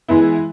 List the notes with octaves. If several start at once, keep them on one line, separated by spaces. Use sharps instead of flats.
E3 G#3 B3 E4